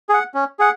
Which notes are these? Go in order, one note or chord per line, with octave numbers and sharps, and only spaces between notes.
G#4 F#5
C#4
G#4 F#5